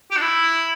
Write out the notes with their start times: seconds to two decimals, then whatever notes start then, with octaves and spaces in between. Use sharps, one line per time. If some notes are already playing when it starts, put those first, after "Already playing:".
0.11 G4
0.17 D4
0.21 E4